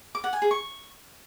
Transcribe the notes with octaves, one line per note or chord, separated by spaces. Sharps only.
D6
F#5
G#5
G#4
C#6